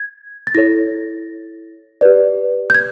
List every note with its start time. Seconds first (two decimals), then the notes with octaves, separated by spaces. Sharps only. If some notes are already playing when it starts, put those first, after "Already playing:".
Already playing: G#6
0.47 A6
0.55 E4 A4 C#5 A#6
2.01 G4 B4 D5
2.70 G6
2.75 G#6